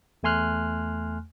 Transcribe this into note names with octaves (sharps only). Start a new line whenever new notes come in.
E2 A3 G#5 C6 F6 F#6